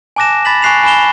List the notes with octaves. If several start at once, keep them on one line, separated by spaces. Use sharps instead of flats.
G#5 A5 D6 F#6 A#6 E7
B5 A6 B6 F#7
G#5 C#6 F#6 C7 E7 F7
G#5 B5 E7 G7